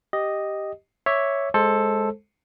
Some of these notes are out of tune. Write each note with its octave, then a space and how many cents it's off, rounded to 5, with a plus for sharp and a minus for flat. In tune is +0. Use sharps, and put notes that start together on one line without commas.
G4 +0 D#5 +0
C#5 +0 E5 +0 D6 -5
G#3 +0 A4 +0 C5 +15